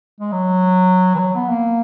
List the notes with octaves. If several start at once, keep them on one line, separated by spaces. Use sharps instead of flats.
G#3
F#3
E3
F#3
B3
A#3